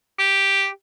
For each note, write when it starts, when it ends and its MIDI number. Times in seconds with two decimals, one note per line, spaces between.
0.19 0.68 67